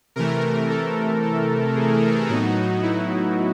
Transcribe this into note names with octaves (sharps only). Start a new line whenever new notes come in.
C3 E3 A3 A#4
A4
A4
G#4
A2 F#3 B3 D#4 F#4
E4